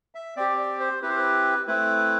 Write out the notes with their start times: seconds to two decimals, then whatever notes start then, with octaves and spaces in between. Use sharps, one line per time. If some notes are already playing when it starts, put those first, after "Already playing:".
0.15 E5
0.37 C4 G4 D5
0.58 D5
0.80 C5
1.02 C4 E4 G4 B4
1.09 C5
1.16 B4
1.67 A3 C4 E4 B4